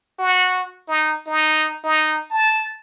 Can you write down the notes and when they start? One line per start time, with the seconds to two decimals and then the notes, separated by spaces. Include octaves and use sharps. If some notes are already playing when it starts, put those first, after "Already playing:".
0.19 F#4
0.88 D#4
1.26 D#4
1.84 D#4
2.30 A5